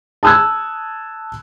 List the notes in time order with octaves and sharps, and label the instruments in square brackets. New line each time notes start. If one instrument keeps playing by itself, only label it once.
[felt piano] A5 D#6 E6 F#6 G#6